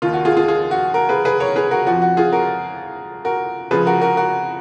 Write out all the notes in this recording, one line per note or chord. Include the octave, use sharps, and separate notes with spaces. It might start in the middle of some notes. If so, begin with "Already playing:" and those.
D#2 D#3 F4
F#4
F4 G#4
F4 G#4
F4 G#4
F#4
F#4 A#4
G#4 B4
G#4 B4
A#4 C#5
G#4 B4
F#4 A#4
F2 F3 F#4
F#4
F4 G#4
F#4 A#4
F#4 A#4
C#2 C#3 F3 G#4 B4
F#4 A#4
F#4 A#4
F#4 A#4